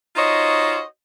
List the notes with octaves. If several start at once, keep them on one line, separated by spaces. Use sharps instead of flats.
D#4 F4 F#4 C5 C#5 D#5